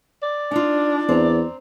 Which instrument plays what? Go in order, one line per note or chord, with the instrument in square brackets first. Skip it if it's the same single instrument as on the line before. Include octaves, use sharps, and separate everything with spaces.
[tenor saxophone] D5
[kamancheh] D4 [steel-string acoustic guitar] D#4 F4
[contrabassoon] E2 [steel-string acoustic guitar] C4 A#5